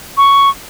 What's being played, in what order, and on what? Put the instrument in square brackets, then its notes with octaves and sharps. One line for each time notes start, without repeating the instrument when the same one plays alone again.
[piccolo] C#6